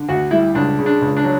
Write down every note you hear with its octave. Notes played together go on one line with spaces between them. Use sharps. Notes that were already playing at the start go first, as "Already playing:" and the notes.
Already playing: D3
D2 F#4
G3 E4
C#2 D4
C#3
D4
C#2
D4
F#3